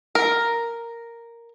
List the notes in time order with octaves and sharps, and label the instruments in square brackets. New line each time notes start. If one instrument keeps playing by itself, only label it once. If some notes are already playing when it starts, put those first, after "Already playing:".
[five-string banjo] A#4